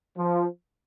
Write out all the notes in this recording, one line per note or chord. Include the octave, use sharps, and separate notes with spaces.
F3